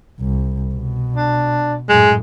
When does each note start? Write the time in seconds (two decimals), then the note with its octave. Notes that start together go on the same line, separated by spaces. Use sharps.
0.20 C2
0.74 B2
1.16 D4
1.89 F#2 A2 G#3